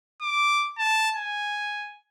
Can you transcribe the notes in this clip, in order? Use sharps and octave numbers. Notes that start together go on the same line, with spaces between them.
D6
A5
G#5